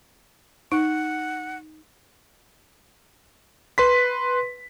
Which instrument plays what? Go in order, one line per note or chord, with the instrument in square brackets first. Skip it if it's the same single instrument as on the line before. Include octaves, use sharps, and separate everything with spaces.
[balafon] D#4 [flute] F#5
[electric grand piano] B4 C6 B6